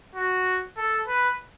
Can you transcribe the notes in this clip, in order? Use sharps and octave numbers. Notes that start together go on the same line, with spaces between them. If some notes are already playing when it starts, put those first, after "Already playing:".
F#4
A4
B4